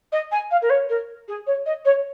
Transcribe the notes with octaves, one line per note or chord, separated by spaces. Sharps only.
D#5
G#5
F5
A#4
C#5
A#4
G#4
C#5
D#5
C#5